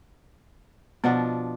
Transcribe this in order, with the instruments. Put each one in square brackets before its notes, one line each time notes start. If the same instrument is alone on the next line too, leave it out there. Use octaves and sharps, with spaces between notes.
[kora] B2 F3 D4 [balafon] B3 F#5